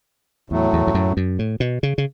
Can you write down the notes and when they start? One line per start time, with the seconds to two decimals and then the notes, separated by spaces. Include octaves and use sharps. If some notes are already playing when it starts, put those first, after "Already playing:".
0.50 E2 A2 F#3 A3
0.73 E2
0.87 E2
0.94 F#2
1.17 F#2
1.39 A2
1.60 B2
1.83 C#3
1.98 C#3